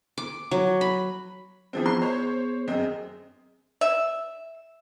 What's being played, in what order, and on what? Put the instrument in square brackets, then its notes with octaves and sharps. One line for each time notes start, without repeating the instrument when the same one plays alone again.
[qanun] D6
F#3
B5
[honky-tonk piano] E3 F3 C4 [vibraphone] B3 G#4 C5
[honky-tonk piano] C6
[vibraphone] B3 G#4 [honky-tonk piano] C5 C#5
[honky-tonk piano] F#2 C4 D#5 [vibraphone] G#4
[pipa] E5